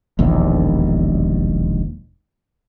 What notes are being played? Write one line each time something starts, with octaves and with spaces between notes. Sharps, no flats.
E1 A#1 D#2